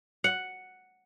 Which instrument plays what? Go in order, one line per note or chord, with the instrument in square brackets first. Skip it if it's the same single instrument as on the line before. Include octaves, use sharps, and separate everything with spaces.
[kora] F#5